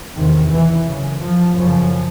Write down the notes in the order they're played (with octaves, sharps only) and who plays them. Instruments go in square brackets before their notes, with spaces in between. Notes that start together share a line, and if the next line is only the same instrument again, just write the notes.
[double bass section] E2 C3 D#3
E3
F#2 C#3
F3
F#2 C#3 F3